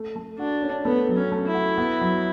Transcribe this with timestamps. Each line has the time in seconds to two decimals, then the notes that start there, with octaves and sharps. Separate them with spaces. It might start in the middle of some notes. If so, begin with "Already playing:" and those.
Already playing: A3
0.16 A3
0.38 D4 F#4
0.62 C#4
0.85 A3 B3
1.09 F#3
1.16 C#4
1.32 A3
1.47 E4
1.54 F#4
1.78 B3
2.01 F#3